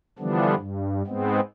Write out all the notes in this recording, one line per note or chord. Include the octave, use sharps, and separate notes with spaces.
D3 E3 F3 G3 B3 D4
G2
G#2 G#3 B3 C4